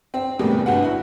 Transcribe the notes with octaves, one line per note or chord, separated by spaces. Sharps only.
C4
E2 A2 C3 G3 A#3 B3
G1 F#4 B4 F#5
E4 F#4